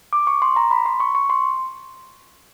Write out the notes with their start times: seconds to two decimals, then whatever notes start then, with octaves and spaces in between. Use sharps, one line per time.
0.13 D6
0.27 C#6
0.42 C6
0.56 A#5
0.71 B5
0.86 C6
1.00 C#6
1.15 C#6
1.30 C6